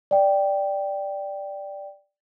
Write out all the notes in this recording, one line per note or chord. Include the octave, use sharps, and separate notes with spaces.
D5 G5